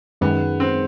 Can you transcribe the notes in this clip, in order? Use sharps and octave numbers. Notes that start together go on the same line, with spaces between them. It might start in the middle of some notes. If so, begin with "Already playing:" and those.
F#2 D#3 G#3 B3
C4